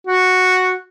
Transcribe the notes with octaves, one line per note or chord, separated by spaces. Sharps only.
F#4